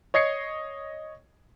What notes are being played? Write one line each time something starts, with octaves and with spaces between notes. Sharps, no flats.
C#5 D#5 G#6 C7 C#7